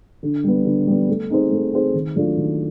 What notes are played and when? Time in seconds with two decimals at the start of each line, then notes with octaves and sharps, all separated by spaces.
0.23 D3
0.44 G3 B3
0.65 D3
0.87 G3 B3
1.09 A3
1.30 C4 D#4 G#4 C5
1.52 A3
1.72 C4 D#4 G#4 C5
1.94 D#3
2.16 F#3 A3 D4 F4
2.37 D#3